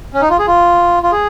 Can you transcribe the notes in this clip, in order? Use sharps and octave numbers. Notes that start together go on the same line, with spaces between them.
C#4
D#4
F4
G#4
F4
F4
G#4